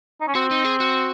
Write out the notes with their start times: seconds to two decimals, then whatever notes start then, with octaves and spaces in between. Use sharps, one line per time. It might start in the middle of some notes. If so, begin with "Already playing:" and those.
0.21 D#4
0.28 C#4
0.35 C4 F#4
0.51 D#4
0.65 G#4
0.80 F#4